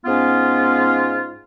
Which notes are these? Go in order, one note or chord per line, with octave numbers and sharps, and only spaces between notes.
G#2 B3 C#4 F4